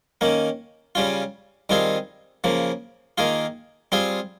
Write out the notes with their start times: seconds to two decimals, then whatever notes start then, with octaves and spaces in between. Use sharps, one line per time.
0.21 D#3 A#3 C#4
0.95 C#3 G3 C#4 F4
1.69 D#3 G3 C4 F4 G#4
2.44 C#3 F3 A#3
3.18 D#3 A#3 F4 G#4
3.92 G3 C4 F4 G#4